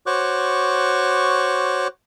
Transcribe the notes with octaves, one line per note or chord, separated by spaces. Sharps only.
F#4 C5 C#5 C#6 D6 F#6